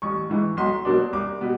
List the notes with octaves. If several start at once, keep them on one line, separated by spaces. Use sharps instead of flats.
A1 C#6
G#2 E3
B1 C6
B2 F#3 A#3 D4
C2 D6
B2 G3 B3